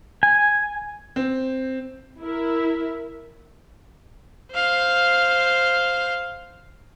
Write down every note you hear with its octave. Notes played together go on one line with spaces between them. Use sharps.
G#5
C4
E4 A#4 E5
C5 F5